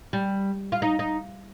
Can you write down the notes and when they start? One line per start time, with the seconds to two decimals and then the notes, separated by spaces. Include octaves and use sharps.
0.13 G3
0.72 F4
0.82 D#4
0.99 D#4